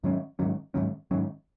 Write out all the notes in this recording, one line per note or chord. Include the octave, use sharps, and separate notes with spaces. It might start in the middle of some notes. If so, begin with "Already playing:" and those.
G#2 D#3 F#3 C#4
G#2 D#3 F#3 C#4
G#2 D#3 F#3 C#4
G#2 D#3 F#3 C#4